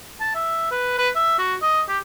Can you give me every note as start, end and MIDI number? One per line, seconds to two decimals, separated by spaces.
0.21 0.31 81
0.35 0.69 76
0.71 0.98 71
0.98 1.09 71
1.16 1.37 76
1.39 1.55 66
1.62 1.82 75
1.89 1.98 67